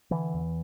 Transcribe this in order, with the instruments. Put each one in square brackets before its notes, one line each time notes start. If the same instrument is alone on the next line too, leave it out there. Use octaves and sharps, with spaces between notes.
[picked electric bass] D3 E3
E2